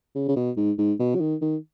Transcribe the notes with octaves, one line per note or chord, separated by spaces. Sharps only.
C#3
C#3
B2
G#2
G#2
B2
F#3
D#3
D#3